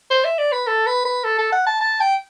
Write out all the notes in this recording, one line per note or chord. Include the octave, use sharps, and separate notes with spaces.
C5
E5
D5
B4
A4
B4
B4
A4
A4
F#5
A5
A5
G5